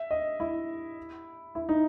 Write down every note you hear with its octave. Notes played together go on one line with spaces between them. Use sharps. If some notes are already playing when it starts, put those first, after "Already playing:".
Already playing: E5
D#5
E4
E4
D#4